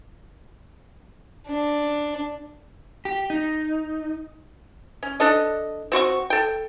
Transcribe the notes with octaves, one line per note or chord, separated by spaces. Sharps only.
D4
G4
D#4
C#4
D4 A4 D#5
C4 F#4 C6 C#6
A4 G5